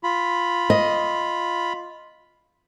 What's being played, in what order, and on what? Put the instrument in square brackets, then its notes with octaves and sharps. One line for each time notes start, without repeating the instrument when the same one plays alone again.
[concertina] F4 B5
[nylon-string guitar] D#5